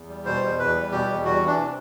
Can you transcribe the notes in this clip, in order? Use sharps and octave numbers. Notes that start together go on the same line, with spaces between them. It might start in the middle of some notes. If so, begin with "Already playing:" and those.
Already playing: E2
G3
B2 C5
E2
E2 B4
G3
B2 G4
E2
G3 F#4
E3
D4
C3